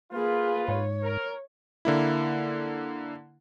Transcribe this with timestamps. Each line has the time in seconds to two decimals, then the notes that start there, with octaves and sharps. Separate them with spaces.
0.13 A#3 F4 G#4 B4
0.68 G#2 C#5
1.03 A#4
1.85 D3 A#3 E4